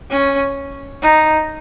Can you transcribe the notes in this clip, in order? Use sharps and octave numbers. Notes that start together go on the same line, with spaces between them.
C#4
D#4